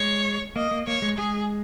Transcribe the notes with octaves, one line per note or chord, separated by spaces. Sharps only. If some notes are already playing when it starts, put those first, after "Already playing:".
Already playing: G#3 C#5
A#3 D#5
A#3
A#3 C#5
G#3
G#3 G#4